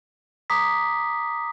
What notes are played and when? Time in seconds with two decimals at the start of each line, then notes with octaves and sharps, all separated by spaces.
0.50 A#5 D6 D#6 B6